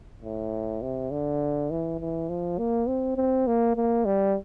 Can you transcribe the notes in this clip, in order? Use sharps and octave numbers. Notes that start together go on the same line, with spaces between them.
A2
C3
D3
E3
E3
F3
A#3
C4
C4
A#3
A#3
G3